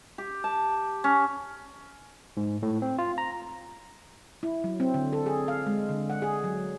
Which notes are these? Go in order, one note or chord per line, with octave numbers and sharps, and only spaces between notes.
G4
A5
C#4
G#2
A2
C4
F4
A#5
E4
F#3
C4
D3
A4
G#4
F5
G#3
D3
F#5
G#4
F#3